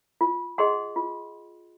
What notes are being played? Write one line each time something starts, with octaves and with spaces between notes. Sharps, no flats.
F4
G#4 D#5 F#5 C6
F4